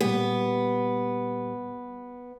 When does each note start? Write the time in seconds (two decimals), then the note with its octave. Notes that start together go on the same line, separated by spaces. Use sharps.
0.01 A#2 G3 B3 G4